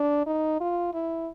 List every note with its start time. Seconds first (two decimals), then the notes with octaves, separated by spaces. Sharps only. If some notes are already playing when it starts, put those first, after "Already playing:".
Already playing: D4
0.27 D#4
0.61 F4
0.94 E4